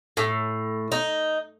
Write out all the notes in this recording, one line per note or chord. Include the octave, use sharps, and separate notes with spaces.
A2
D#4